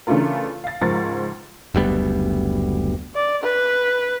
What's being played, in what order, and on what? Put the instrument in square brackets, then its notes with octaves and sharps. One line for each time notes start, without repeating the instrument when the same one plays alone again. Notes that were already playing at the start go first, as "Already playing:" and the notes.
[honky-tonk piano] C#3 E3 A3 D4 F4 A#4
F5 A6
C#2 G#2 F3 A#4 C#6 A6
[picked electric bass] F#1 D2 G3 B3
[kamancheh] D5
B4